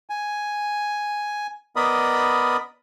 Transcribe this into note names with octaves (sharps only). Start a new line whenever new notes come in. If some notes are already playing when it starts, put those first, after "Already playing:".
G#5
B3 A#4 D5 D#5 B5 D#6